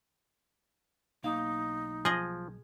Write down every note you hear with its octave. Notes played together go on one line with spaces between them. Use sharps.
B1 A#3 D#4 F5
F3 G#4 D#5